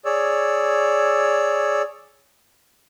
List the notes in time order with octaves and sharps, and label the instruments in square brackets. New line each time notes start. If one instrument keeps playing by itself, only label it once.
[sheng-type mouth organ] G#4 C#5 D5 E6